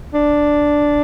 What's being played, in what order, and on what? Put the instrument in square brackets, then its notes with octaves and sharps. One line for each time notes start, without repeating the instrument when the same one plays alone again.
[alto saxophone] D4